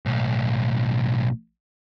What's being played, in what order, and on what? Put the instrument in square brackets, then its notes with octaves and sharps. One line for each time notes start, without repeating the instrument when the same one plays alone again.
[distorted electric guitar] B1 A2